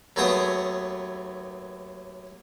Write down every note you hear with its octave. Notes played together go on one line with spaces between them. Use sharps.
D#2 F#3 A3 B3 G#4 D#6